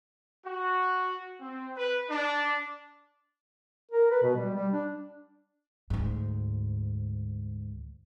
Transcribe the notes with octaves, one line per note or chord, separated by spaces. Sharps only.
F#4
C4
B4
D4
A#4
B4
B2
G3
G3
D4
D2 G#2